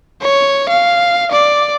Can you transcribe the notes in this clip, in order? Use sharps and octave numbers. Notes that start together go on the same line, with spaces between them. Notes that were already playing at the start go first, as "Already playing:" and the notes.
C#5
F5
D5